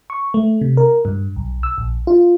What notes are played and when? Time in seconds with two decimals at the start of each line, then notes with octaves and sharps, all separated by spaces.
0.10 C#6
0.34 A3
0.61 C3
0.77 A#4
1.05 G2
1.36 B1
1.63 E6
1.78 A#1
2.07 F4